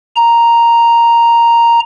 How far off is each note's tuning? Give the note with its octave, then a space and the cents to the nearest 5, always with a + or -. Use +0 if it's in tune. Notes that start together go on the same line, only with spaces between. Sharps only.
A#5 +0